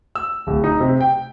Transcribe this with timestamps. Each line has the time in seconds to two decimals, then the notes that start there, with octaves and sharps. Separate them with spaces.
0.15 E6
0.47 D1
0.64 D#4
0.80 C3
1.01 G5